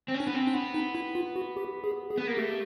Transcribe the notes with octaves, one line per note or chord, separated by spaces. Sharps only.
C4
C#4
D4
B3
C4
D4
B3
D#4
E4
F4
F#4
G4
G#4
G#4
B3
A#3
A3 G4